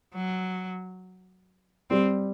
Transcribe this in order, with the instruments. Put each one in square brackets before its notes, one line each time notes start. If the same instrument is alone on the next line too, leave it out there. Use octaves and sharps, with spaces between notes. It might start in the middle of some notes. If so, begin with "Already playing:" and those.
[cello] F#3
[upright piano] G3 [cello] C4